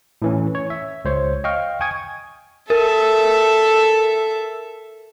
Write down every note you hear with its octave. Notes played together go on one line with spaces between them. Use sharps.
A2 E3 C#4
C#5
E5
C#2 C5 C#5
D#5 F5 G5 C#6 F6
G5 G#5 C#6 D#6 G#6
A4 A#4 E5